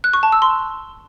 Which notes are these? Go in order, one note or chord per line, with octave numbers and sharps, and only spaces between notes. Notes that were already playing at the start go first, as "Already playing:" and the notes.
F#6
C#6
A5
E6
C6